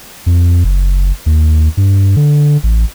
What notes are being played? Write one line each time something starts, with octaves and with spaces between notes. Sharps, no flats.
F2
F#1
D#2
G2
D3
A1